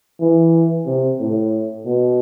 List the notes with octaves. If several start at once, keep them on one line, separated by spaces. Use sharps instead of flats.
E3
C3
A2
B2